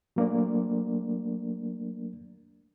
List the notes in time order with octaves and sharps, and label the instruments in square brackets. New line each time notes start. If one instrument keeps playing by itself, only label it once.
[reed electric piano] F#3 A3 A#3 D4 A#4 D5